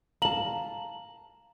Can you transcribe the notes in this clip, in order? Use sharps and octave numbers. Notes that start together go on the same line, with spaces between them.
F5 A5 A#5 F#7